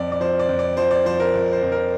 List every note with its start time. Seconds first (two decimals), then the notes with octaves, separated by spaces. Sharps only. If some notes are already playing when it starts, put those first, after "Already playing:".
Already playing: F2 F3 D5
0.12 D5
0.20 F3 C5
0.39 D5
0.49 F2
0.59 D5
0.77 F3 C5
0.91 D5
1.06 F3 C5
1.20 A#4
1.34 F2
1.53 C5
1.63 F2
1.72 A#4